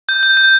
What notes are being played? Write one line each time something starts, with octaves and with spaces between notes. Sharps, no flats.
G6
G6
G6